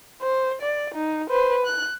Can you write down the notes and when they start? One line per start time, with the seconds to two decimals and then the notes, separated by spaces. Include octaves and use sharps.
0.22 C5
0.61 D5
0.95 D#4
1.30 B4 C5
1.66 F#6